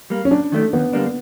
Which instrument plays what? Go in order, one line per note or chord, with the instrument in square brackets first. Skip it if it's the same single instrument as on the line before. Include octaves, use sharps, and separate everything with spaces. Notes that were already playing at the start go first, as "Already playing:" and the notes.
[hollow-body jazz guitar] G3 A#3
[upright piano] C#4
[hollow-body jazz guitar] F#2 [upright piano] D4
[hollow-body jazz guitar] D#3 F#3 A3 D4
[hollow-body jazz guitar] D#2 [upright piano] B3
[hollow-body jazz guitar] D3 G3 A#3 D4